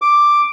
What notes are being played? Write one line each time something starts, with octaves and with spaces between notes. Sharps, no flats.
D6